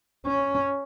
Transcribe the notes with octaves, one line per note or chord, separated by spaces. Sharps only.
C#4